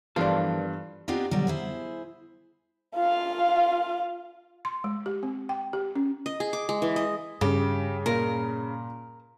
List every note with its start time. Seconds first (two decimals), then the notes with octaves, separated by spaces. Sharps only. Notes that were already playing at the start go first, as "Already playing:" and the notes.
0.16 G2 E3 F3 B3 F4 A4 A#4 D5
1.08 B3 C4 D4 D#4 F4 G4
1.31 B2 D3 F#3 G3
1.47 E4 G#4 C5
2.95 F4 F5
4.65 C6
4.84 G#3
5.06 G4
5.23 C4
5.49 G5
5.73 G4
5.96 C#4
6.26 D#5
6.40 G#4
6.53 D6
6.69 G#3
6.82 E3
6.96 D#5
7.41 G2 C#3 G4
8.06 A#2 A#4